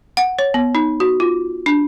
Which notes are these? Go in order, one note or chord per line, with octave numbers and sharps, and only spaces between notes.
F#5
C#5
B3
D#4
F#4
F4
D4